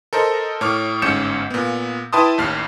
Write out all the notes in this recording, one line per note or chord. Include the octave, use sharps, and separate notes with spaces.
A4 A#4 C5 D#5
A2 C#5 D6 F6
G1 G#2 C#4 G6 C#7 E7
A#2 B3
E4 B4 G5 A5 C6 D#6
A1 D#2 F6 C7